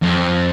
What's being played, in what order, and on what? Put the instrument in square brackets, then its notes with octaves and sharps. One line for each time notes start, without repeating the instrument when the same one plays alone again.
[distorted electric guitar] F2